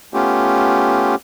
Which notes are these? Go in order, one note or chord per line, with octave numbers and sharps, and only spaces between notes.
A3 B3 C#4 F4 G4